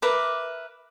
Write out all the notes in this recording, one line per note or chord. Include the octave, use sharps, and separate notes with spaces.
A#4 B4 E5 D6